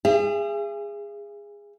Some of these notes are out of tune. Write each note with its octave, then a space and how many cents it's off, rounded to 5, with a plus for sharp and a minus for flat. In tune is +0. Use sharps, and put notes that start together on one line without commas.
G#4 -20 E5 +45 G5 +30